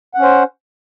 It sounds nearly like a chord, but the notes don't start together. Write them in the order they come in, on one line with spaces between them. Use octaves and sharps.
F#5 C#4 C5